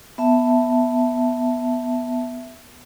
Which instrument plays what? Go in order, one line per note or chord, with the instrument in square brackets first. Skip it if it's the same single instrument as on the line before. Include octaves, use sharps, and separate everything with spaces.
[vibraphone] B3 E5 A5